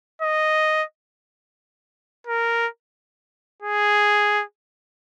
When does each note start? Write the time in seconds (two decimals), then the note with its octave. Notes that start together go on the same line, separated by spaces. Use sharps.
0.22 D#5
2.27 A#4
3.62 G#4